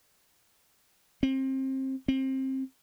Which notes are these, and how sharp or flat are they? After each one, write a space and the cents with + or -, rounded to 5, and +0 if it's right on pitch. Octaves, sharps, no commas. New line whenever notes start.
C4 +25
C4 +25